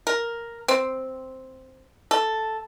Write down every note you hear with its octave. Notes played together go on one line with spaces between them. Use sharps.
A#4
C4
A4